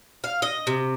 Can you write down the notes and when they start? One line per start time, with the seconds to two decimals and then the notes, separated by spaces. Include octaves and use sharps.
0.24 F5
0.42 D#5
0.67 C3